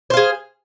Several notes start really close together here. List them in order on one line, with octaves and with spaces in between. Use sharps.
C5 F5 G#4